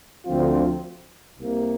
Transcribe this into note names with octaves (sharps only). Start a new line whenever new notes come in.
D2 D3 F3 C4 F4
C2 C3 A#3